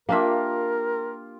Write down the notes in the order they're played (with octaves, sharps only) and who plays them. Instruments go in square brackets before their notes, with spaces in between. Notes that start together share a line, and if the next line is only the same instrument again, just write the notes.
[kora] A#3 D4 E5 [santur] F4 G4 [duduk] A#4